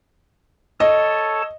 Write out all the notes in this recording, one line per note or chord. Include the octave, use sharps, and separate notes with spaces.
A4 C#5 D#5 A5